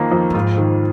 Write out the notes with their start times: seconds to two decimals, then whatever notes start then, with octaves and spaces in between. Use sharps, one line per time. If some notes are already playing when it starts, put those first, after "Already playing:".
Already playing: F2 D#3 A#3 D#4
0.12 F2
0.30 G2
0.34 G#2 F4
0.58 D#3